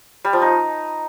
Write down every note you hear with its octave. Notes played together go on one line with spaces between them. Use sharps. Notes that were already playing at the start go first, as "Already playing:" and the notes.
G3
F3
D#4